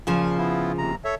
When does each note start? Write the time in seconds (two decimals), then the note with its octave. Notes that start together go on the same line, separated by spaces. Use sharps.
0.07 A#2 C#3 F3
0.38 B3 E4 F4
0.78 D#2 C3 A#5
1.04 A4 C#5 E5